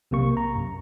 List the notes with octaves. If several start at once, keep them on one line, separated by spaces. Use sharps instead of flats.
B1 C3 A#3 C#6
A#5
F#2